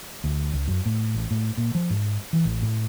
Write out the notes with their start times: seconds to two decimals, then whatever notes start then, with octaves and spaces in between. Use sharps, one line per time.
0.24 D2
0.53 C#2
0.68 F#2
0.86 A2
1.15 A1
1.31 A2
1.57 A#2
1.75 F3
1.90 G#2
2.33 E3
2.45 A1
2.62 A2